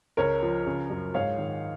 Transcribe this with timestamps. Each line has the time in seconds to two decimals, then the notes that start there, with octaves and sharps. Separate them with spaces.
0.17 C#2 A#4 C#5
0.42 F3
0.66 C#3
0.90 F#2
1.14 G#2 C#5 F5
1.38 D#3